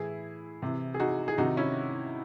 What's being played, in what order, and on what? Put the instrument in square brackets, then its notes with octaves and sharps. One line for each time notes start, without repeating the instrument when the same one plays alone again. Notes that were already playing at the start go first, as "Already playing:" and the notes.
Already playing: [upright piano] A2 E3 E4 G#4
C3 E3
G#4
D#4 F#4
G#4
C3 D#3 D#4 F#4
C#4 E4